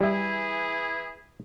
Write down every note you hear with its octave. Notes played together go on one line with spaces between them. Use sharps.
E3 G3 E4 G#4 E5